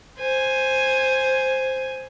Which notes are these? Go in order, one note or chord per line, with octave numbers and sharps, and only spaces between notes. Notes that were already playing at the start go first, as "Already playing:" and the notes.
C5 G#5